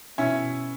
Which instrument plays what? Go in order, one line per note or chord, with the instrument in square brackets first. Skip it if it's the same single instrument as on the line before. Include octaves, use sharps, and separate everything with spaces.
[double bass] B2 [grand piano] C#4 E4